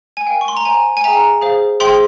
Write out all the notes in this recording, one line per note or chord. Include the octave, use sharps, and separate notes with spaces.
G#5
A#4 F5 G5
C#6
C6
A#5
C5 E5 G5 G#5
G#5
G#4 E5 G5 A#5
G#4 C5 F5
G#4 C5 E5 G5 C6